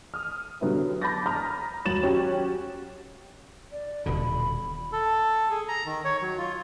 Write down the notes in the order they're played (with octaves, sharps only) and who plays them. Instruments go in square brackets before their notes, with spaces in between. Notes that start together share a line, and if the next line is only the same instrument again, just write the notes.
[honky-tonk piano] D#6 F6
D3 F#3 B3 E4 G4
A5 B5 D6 G6 A6 A#6
A#5 B5 D#6 F6
D#2 F#3 A6 E7 F#7
C#4 F#4 G4
[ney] D5
[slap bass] D#1 B2 D3 [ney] B5
[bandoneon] A4
G#4
A#5
D#3
C#5
F#3
F4